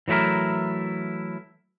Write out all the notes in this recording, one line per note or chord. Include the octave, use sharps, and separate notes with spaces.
E3 F#3 A3 E4 A#4